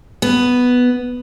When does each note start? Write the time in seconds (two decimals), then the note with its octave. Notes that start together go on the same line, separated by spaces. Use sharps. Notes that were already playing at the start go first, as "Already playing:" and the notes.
0.22 B3